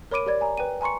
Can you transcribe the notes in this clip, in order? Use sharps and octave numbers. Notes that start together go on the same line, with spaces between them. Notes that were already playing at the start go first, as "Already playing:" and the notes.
A#4 C#5 B5 D6 D7 D#7
G4 A#4 D5 G#6
G#5 A#5
B4 G5 D#7
G#5 A#5 C6 C#6 C#7